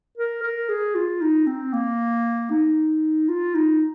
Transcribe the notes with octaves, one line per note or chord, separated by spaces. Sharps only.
A#4
A#4
G#4
F4
D#4
C4
A#3
D#4
F4
D#4